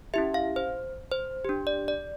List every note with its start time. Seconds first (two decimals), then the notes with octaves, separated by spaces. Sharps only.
0.14 C#4 E4 G4 E5
0.34 F5
0.56 C5
1.12 C5
1.45 D4 G4
1.67 D5
1.88 D5